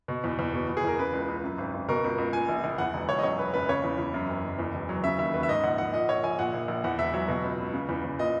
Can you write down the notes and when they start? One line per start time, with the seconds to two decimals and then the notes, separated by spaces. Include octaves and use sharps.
0.08 B2
0.24 E2
0.39 E2
0.53 B2
0.69 E2
0.77 G#4
0.84 E2 A#4
0.99 C#3 B4
1.13 C#2
1.28 C#2
1.44 F#2
1.58 G#1
1.74 G#1
1.88 B2 A#4
2.04 C#2
2.18 C#2
2.33 A#2 G#5
2.49 A#1
2.64 A#1
2.78 E2 F#5
2.93 E1
3.09 E1 C#5
3.19 D#5
3.23 F#2 C#5
3.39 F#1 B4
3.54 F#1 B4
3.69 C#3 C#5
3.84 E2
3.98 E2
4.14 F#2
4.28 F#1
4.44 F#1
4.59 E2
4.74 E1
4.89 F#3
5.04 C#3 E5
5.18 D#2 E5
5.34 D#2 B4
5.43 E5
5.49 G#2 D#5
5.64 A#1 F#5
5.78 A#1 F#5
5.93 A#2 D#5
6.09 A#1 C#5
6.24 A#1 G#5
6.39 A#2 F#5
6.54 A#1
6.68 A#1
6.84 E2 F#5
6.98 E1 E5
7.14 F#3 E5
7.28 B2
7.44 C#2
7.59 C#2
7.73 C#3
7.89 E2
8.04 E2
8.19 A#2 D#5